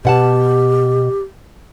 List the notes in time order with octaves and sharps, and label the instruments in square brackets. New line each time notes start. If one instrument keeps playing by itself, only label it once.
[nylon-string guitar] B2 F#5 A5 [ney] G4